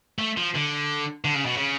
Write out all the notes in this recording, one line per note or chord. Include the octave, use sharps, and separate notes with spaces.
A3
F3
D3
D3
C#3
B2
C#3